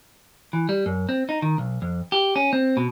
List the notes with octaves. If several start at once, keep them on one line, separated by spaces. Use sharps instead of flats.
E3
G3
F#2
C4
D#4
D#3
B1
F2
G4
C#4
C4
B2